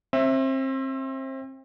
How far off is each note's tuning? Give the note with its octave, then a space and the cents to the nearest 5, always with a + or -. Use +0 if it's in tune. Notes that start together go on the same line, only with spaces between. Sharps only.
C4 +30 E5 +0